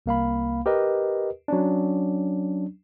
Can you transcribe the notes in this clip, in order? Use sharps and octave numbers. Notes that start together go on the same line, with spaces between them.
C2 A#3 F5 B5
G4 A#4 B4 D#5
F#3 C#4 D4